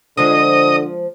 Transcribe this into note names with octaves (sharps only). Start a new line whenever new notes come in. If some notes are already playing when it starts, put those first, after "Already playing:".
D3 F3 G#3 D#5 D#6